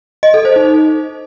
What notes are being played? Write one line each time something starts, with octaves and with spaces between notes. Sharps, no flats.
D#5
A4
C5
D#4